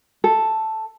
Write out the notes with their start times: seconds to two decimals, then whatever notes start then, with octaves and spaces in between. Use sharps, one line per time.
0.24 A4